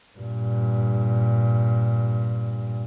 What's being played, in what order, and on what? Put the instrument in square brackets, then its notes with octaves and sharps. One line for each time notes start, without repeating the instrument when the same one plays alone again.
[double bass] G2 A#2